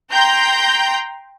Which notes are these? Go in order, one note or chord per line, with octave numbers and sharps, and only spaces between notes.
G5 A#5 C6 G6